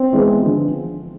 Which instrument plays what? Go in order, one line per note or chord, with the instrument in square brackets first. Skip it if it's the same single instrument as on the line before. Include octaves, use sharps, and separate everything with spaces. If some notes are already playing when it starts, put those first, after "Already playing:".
Already playing: [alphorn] C4
[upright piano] E3 G#3 B3
D3 F3